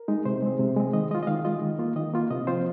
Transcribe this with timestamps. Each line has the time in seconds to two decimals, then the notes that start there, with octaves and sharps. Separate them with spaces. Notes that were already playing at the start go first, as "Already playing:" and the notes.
Already playing: A#4
0.08 G#3 D#4
0.25 C3 C5
0.42 G#3 C4
0.60 C3
0.77 G#3 C4
0.93 D#3 D#5
1.11 G#3 D#5
1.15 F4
1.23 D#5
1.27 D#3 F5
1.45 G#3 F4 D#5
1.62 D#3
1.79 A#3 F4
1.96 D#3 D#5
2.13 A#3 F4
2.30 C3 D#5
2.47 F3 C4 F4 C5